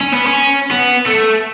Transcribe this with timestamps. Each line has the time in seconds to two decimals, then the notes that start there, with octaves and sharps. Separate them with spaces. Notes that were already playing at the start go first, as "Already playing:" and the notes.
0.01 C#4
0.13 B3
0.27 C#4
0.71 B3
1.06 A3